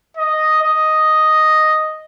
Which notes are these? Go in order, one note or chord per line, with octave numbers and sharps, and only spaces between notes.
D#5
D#5